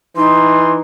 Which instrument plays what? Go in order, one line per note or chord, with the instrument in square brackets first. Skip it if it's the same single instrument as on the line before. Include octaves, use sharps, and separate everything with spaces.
[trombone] E3 [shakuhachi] D#4 [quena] C6